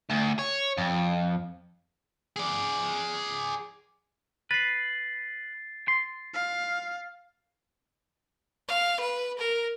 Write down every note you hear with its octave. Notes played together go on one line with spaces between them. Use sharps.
D2
C#5
F2
G#4 D5
B4 A6 C7
C6
F5
F5
B4
A#4